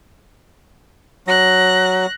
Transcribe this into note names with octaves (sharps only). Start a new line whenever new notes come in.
F#3 F#6 A#6